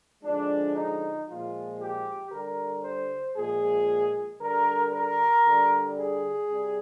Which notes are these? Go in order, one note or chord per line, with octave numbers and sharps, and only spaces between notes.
D3 F3 G#3 D4
D#4
A#2 F3 G#3 F4
G4
D3 G3 A#4
C5
A#2 F3 G#3 G#4
D3 G3 A#4
A#4
D3 G3
G#4
C3 G3